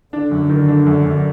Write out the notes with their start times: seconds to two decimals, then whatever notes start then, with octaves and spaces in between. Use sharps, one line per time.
0.13 D3 D4
0.31 F#2
0.49 D#3
0.68 D4
0.86 F#2
1.05 F#2